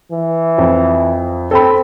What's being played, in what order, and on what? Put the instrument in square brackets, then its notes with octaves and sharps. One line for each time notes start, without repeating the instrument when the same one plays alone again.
[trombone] E3
[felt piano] F2
[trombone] C4 [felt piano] A4 B5